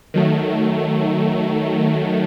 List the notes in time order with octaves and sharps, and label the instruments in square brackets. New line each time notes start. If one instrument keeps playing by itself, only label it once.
[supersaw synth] D#3 F#3 A3